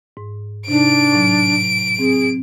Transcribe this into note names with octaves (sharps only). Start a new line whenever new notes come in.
G#2
C3 D4 D#4 D7
A2 F#3
C4 G#4